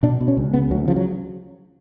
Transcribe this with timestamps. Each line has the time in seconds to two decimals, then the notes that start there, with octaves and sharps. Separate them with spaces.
0.03 B2 D4
0.21 B2
0.28 C#4
0.37 C#2
0.53 C#3 B3
0.71 D2 F#3
0.88 C#3 F3
0.96 F#3